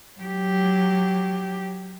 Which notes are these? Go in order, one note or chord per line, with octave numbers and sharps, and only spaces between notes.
F#3 G4